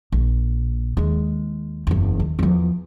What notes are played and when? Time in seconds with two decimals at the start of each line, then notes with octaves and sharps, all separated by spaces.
0.12 A#1
0.97 D#2 G#3
1.87 F#1 E2
2.20 D#2
2.39 E2 F3